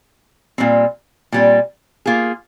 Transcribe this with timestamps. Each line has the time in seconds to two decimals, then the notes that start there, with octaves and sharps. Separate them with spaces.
0.58 A#2 G3 C4
1.32 A#2 G3 C4
2.06 A#3 F4 G#4